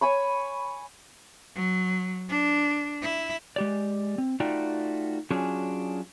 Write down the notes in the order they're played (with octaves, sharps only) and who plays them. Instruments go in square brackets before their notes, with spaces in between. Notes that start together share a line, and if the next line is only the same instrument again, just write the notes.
[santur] C#5 G#5 B5 C#6
[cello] F#3
D4
E4
[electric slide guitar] G#3 G4 D5
C4
A3 D#4 F4 F#4 D5 G5
F#3 C#4 D4 F4 F#4 G#4